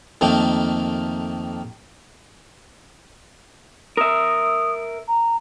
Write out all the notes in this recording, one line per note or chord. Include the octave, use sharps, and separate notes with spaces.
F2 D#3 A3 A#3
A#4 E5 D#6
A#5